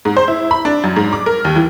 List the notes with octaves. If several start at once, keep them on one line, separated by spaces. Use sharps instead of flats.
G#2
C5
E4
B5
D4
F#2
G#2
D6
A#4
D#2
E3